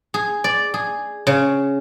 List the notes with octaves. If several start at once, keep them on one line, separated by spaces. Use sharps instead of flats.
G#4
D5
G#4
C#3